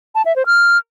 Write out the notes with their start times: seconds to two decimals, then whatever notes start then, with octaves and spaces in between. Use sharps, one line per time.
0.15 A5
0.25 E5
0.36 C5
0.46 F6